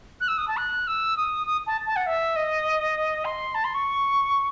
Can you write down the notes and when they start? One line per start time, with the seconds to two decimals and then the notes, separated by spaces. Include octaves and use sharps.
0.20 F#6
0.28 E6
0.37 D#6
0.47 A5
0.57 F#6
0.87 E6
1.16 D#6
1.46 D#6
1.66 A5
1.86 A5
1.96 F#5
2.06 E5
2.36 D#5
3.25 C6
3.54 A5
3.64 C6
3.74 C#6